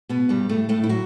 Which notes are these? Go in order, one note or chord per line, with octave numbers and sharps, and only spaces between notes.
B2 B3
G2 G3
A2 A3
A2 A3
E4
F#3 F#4